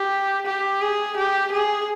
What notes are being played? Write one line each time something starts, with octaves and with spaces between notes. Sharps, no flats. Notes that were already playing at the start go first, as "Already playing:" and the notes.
Already playing: G4
G4
G#4
G4
G#4